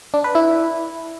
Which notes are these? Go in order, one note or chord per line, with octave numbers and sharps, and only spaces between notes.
D4
B4
E4